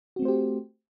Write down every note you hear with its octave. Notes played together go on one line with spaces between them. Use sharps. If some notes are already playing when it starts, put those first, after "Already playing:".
A3 C4 F#4 G4 C5